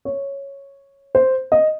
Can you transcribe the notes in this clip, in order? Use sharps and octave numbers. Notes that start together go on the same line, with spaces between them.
C#5
C5
D#5